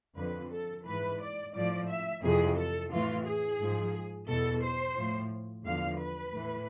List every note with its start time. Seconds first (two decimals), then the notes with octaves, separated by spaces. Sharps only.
0.16 F2 D3 F3 B4
0.50 A4
0.85 G#2 E3 B4
1.20 D5
1.54 A2 F3 D5
1.87 E5
2.23 F2 C3 E3 G#4
2.56 A4
2.91 A2 E3 F4
3.25 G#4
3.59 G#2 F3
4.28 E2 B2 A4
4.63 C5
4.96 A2 F3
5.65 E2 D3 F3 F5
5.99 B4
6.34 A2 E3